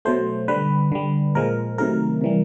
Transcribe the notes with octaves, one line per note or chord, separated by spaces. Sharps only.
B2 F#3 A3 C5
D3 G3 B4
D3 G3
A#2 F3 G#3 A#4
C3 D#3 F#3 A3 A#4
C3 E3 G3